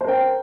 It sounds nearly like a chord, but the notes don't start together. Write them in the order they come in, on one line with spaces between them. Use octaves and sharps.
C5 A#4 G5